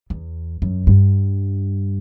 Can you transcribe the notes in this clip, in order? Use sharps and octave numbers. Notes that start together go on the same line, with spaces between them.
E2
F#2
G2